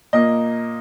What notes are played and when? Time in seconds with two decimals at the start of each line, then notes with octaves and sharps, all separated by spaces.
0.13 A#2 A#3 D#5